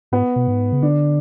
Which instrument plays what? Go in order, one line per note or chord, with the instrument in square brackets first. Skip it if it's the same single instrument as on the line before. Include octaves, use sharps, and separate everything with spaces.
[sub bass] G#2 [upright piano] B3
[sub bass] B2
G#2
C#3
[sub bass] D3 [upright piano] D4